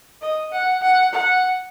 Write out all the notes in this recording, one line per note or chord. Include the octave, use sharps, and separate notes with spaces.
D#5
F#5
F#5
F#5